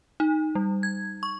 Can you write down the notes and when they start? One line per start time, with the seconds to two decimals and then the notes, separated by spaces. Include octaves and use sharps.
0.20 D#4
0.55 G3
0.83 G#6
1.23 C#6